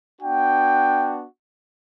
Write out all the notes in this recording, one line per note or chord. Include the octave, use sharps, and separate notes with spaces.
B3 D4 F#4 G5